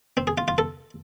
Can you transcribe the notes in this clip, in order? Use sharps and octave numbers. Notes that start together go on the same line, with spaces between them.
C4
G#4
F4
F4
A4